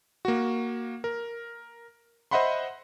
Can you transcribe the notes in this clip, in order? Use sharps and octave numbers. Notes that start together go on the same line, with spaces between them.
A#3 F#4
A#4
C5 D#5 E5 F#5 B5 C6